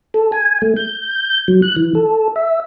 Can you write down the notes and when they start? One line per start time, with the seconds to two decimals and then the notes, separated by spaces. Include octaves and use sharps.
0.14 A4
0.32 G#5
0.62 A3
0.76 G6
1.48 F#3
1.62 F#6
1.76 E3
1.95 A4
2.36 E5